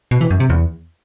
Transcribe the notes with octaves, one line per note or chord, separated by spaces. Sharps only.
B2
E3
F#2
C3
E2